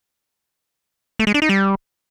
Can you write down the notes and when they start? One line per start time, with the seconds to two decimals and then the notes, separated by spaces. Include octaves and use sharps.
1.19 A3
1.27 G#3
1.34 D4
1.42 D#4
1.49 G3